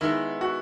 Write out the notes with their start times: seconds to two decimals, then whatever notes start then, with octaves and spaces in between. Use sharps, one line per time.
0.01 D#3 G#3 B3 E4
0.41 F#4